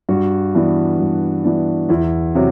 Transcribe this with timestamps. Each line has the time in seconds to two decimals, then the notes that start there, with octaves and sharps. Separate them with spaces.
0.09 G2 F#4
0.54 E3 B3 D4
0.99 G2
1.44 E3 B3 D4
1.89 E2 E4
2.35 C3 F#3